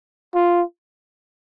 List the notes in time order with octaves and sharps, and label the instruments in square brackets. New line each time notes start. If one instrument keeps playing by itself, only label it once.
[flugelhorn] F4